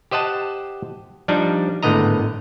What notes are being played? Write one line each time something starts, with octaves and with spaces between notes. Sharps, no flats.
G4 C5 D#5 F#5 A5
F3 G3 D4 D#4
G#1 A2 D3 B3 D#5 A#5